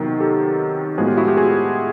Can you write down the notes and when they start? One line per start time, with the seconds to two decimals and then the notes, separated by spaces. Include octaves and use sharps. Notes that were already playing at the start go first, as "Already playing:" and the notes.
Already playing: C3 D#3 F#3 B3
0.20 G4 A4
0.98 A2 F3 G#3 B3 F#4 G#4
1.07 F4 G4
1.18 E4 F#4
1.27 F4 G4
1.37 F#4 G#4